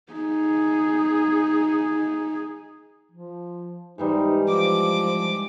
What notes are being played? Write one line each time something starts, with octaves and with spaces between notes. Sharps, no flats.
D#4 G#4
F3
G#2 E3 G3 D#4
F3 D6